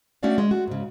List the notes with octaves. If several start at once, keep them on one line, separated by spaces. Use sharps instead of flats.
A3 C#4 D4 F#4 D5 F5
G#3
F#4
G#2 C#3